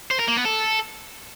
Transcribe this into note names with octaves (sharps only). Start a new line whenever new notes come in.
C5
A#4
A#3
B3
A4